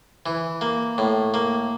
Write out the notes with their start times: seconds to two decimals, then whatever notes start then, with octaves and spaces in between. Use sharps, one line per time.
0.26 E3
0.61 A#3
0.98 A2
1.34 A#3